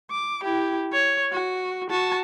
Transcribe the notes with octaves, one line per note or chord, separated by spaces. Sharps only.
D6
E4 G4
C#5
F#4
F#4 A5